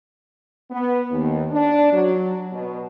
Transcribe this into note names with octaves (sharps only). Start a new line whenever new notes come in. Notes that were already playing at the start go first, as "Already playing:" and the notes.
B3
D#2
D4
F#3
B2